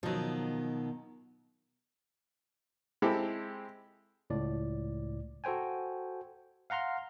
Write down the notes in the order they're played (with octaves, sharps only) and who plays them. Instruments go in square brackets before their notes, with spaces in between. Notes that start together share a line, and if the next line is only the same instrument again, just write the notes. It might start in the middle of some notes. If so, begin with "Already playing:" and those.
[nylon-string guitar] B2 D#3 [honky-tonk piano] F3 F#3
[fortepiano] G#3 C4 E4 G4 A4
[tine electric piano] C#2 A2 D5
F#4 A4 C5 G5 G#5
F5 F#5 A#5 C6 F6